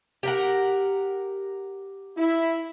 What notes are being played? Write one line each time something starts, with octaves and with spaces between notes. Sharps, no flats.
G4 A#4 F#5
E4